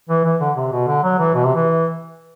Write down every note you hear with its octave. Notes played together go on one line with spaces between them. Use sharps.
E3
E3
D3
C3
B2
D3
F#3
E3
B2
C3
E3